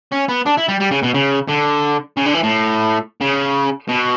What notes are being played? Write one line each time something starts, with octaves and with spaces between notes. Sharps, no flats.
C#4
B3
D4
E4
G3
G3
C#3
B2
C#3
D3
C#3
D3
E3
A2
C#3
B2